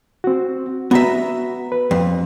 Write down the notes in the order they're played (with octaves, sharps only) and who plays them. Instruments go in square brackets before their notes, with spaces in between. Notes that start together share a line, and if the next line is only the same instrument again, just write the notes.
[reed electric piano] C4 F#4
[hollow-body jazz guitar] B3 E5 [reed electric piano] F#4 A#5
[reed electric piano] B4
[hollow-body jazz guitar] F2